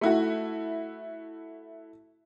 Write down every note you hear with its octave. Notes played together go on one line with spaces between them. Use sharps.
A3 E4 F#4